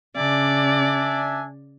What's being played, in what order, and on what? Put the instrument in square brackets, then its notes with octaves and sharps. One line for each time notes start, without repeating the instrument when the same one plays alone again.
[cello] C#3 [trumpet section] D4 E5 G#5 [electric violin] D5